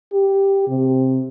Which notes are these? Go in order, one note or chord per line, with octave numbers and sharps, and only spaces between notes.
G4
C3